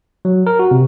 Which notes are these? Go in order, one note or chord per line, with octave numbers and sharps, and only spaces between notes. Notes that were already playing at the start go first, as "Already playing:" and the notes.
F#3
A#4
F#4
C3